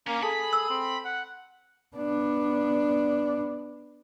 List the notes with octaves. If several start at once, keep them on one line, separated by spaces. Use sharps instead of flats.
A#3 C#4
G#4 A4 A5 B5
E6
C4
F#5
B3 D4